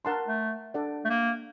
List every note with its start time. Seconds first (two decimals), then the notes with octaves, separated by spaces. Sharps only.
0.05 D4 A#4 F#5 A5 C6
0.28 A3
0.74 D4 A4 D5 F#5
1.05 A3
1.09 A#3